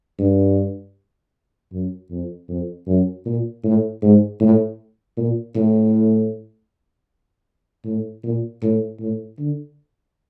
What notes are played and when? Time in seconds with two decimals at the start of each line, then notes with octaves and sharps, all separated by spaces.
0.19 G2
1.72 F#2
2.10 F2
2.49 F2
2.87 F#2
3.25 A#2
3.64 A2
4.02 G#2
4.40 A2
5.17 A#2
5.56 A2
7.85 A2
8.24 A#2
8.62 A2
9.00 A2
9.39 D3